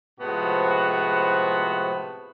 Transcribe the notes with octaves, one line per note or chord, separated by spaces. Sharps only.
A2 C3 F3 G#3 B3 F#4